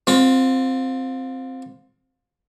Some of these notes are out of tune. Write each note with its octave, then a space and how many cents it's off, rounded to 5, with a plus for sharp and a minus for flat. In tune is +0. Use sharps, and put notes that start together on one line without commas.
C4 +0 F4 +30